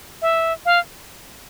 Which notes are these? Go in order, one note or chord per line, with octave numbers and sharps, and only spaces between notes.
E5
F5